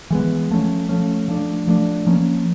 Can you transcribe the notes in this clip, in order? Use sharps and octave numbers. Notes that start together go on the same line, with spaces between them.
E3 G#3 B3
F3 A3 C#4
F3 A3 C#4
F3 A3 D4
F3 A3 D4
F3 A#3 C#4